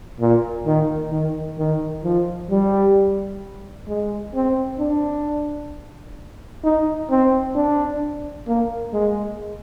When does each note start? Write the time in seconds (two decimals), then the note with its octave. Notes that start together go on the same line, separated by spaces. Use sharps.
0.20 A#2
0.66 D#3
1.12 D#3
1.58 D#3
2.04 F3
2.50 G3
3.88 G#3
4.34 C4
4.79 D4
6.64 D#4
7.10 C4
7.55 D4
8.47 A#3
8.93 G#3